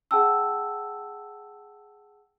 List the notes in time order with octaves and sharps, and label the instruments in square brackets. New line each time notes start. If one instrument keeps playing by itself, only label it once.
[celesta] G#4 F#5 G5 A5 E6